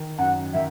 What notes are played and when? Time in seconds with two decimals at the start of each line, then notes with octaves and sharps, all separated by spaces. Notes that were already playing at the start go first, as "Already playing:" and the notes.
Already playing: D#3
0.18 F#2 F#5
0.54 D#3 E5